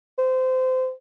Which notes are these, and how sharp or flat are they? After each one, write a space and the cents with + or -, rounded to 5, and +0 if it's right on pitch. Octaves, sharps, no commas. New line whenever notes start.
C5 -25